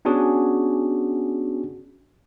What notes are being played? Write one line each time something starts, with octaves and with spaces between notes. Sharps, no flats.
B3 C#4 D4 F#4 G#4